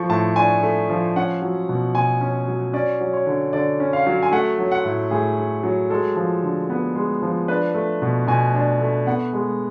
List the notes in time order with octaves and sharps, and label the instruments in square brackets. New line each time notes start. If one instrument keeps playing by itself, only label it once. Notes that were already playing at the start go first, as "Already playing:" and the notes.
Already playing: [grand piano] F3 A3 C#6
A2 A5
D4 G#5
A3
F3
C#4 F#5
F#3
B2
B2 G#5
C#4
F#3
C#4 D5
F#3
C#5
D3
D3 D5
C#4
F5
F#3
G#5
A3 F#5
F#3
F#5
A2
A2 G#4
A3
F#3
G#3 A4
F3
D3
B3
G#3
F3
D4 B4
A3
B2
B2 G#5
D4
A3
B3 F#5
G#3